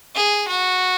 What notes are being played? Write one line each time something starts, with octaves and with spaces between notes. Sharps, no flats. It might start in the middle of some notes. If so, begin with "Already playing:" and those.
G#4
F#4